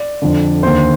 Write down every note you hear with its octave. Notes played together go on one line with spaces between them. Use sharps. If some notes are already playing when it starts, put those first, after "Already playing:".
Already playing: D5
F2 D3
D#2 D3 C5